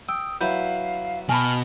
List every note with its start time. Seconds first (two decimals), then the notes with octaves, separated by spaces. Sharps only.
0.09 G5 D#6 E6
0.41 F#3 E4 B4 F5 G6
1.29 B2 G#5 A5 B5 F6